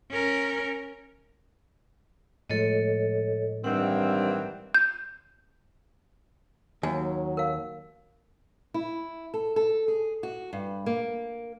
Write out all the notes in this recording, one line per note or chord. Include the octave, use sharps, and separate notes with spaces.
C#4 A#4
A2 F3 G#3 A4 C#5 D#5
G2 D#3 E3 C4 F#5
G6
D#2 F#3 G#5
A#4 F5
E4
A4
A4
G#4
F#4
G2
A#3